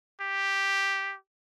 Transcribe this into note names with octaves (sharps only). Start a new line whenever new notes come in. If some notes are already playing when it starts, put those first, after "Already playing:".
G4